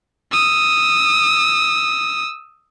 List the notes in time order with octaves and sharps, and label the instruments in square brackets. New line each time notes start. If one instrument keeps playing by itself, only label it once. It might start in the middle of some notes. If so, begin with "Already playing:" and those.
[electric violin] D#6 E6